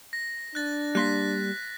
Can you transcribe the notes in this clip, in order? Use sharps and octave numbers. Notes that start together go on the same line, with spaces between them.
A#6
D4 F#6 A6
G3 A#3 C6 F#6 A#6 B6